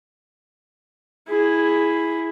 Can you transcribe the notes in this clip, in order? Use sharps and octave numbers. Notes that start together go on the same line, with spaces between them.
E4 G#4